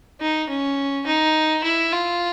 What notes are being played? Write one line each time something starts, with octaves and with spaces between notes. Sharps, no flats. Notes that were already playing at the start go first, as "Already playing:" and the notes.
D#4
C#4
D#4
E4
F4